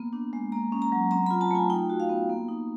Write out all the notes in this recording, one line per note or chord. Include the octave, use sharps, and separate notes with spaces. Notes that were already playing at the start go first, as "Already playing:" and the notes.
Already playing: A#3 B3
D4
G#3
A#3 A#5
C#4
A#5
F#3
C4 A#5
B5
F4
A5
A3 G#5
D#4 G5
F#4
F5
B3
A#3
D#4